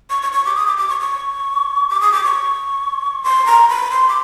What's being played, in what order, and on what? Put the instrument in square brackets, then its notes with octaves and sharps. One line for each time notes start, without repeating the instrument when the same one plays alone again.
[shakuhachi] C#6
C#6
C#6
D6
D#6
D6
D6
C#6
C#6
D6
D#6
D6
C#6
C6
A#5
B5
C6
D6